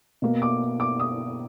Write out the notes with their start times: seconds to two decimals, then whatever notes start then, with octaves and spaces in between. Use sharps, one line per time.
0.22 B2 A#3
0.42 D6
0.80 D6
1.00 D#6